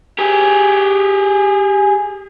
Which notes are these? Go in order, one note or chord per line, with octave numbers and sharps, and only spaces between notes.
G4 G#4